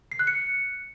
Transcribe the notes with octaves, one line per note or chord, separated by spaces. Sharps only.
C7
F#6
C#7